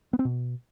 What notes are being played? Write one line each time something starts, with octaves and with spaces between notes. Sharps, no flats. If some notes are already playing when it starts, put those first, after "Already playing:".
B3
C4
B2